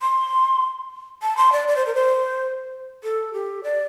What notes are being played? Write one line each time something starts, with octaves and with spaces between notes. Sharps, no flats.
C6
A5
C6
D5
D5
C5
A#4
C5
A4
G4
D5